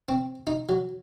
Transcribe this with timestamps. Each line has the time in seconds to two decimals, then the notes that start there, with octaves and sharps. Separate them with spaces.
0.09 C4
0.47 D#4
0.69 F#3